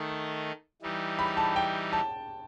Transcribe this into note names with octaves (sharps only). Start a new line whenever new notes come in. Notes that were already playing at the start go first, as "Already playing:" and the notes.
Already playing: D#3 A3 D#4
E3 G3 D#4
B5
A5
G5
A5